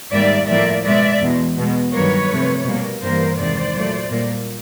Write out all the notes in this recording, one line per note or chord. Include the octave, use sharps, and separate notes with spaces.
G#2 D#3 G3 A#3 D5 E5
A2 F3 A#3 D5 E5
B2 G#3 D5 E5
E2 B2 G#3
B2 G#3
G2 D#3 F#3 A#3 B4 C#5
C3 F3 A3
B2 G3 A#3
G2 E3 G3 A#3 A#4 C5
E2 C3 D#3 G#3 C5 D5
A#2 F#3 A3
A#2 G3 A#3